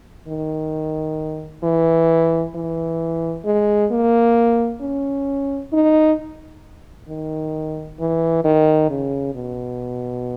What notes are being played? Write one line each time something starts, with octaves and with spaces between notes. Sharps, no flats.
D#3
E3
E3
G#3
A#3
C#4
D#4
D#3
E3
D#3
C#3
B2